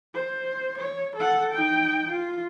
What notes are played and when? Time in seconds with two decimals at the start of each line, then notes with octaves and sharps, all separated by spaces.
0.15 C5
0.78 C#5
1.16 A4 F#5
1.52 D#4 G5
2.10 F4